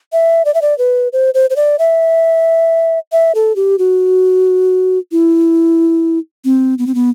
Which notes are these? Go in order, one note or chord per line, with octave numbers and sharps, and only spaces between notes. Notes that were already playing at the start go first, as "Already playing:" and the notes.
E5
D5
E5
D5
B4
C5
C5
C5
D5
E5
E5
A4
G4
F#4
E4
C4
B3
C4
B3